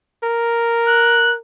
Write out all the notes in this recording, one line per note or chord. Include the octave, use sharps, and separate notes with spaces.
A#4
F#6